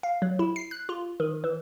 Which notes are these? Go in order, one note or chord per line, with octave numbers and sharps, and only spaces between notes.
F5
F#3
E4
C7
F#6
F4
D#3
E3